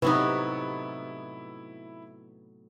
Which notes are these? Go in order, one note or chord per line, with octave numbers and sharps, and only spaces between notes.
A2 C3 F#3 B3 C4 D#4 E4 B4